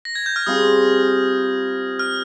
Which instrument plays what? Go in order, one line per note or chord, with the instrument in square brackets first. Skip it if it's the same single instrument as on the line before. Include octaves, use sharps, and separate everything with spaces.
[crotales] A#6
G#6
G6
F6
[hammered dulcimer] G3 C4 F4 G#4 [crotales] D#6
[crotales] F6